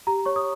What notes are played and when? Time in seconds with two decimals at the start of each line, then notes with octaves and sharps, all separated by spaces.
0.07 G4 A#5
0.26 C#5 C#6
0.36 D#6